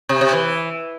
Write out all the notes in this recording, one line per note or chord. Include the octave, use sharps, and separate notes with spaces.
C3
C3
E3